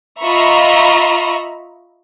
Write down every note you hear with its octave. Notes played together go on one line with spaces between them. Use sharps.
F4 D#5 E5 A#5 B5 C#6